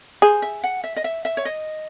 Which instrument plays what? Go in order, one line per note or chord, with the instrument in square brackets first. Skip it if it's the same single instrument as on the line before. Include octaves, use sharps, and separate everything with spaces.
[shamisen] G#4 [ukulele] C5
[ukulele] E5
F#5
E5
D#5
E5
E5
C#5
D#5